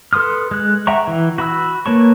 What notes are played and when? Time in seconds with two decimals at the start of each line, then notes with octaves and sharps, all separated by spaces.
0.13 A4 B4 C6 D#6 F6
0.51 G#3 F#6
0.87 E5 F#5 G5 A#5 C#6
1.08 E3
1.38 F#4 B5 E6
1.86 A#3 B4 C#5 A5 C#6